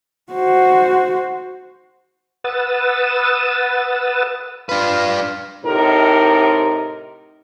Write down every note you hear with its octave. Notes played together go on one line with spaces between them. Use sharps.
F#4 C5
B4 F#5 D#6 E6 A6
D4 F4 B4
A2 C3 D#4 A#4